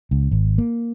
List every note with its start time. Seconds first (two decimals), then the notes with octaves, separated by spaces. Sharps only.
0.11 C#2
0.31 G#1
0.58 A#3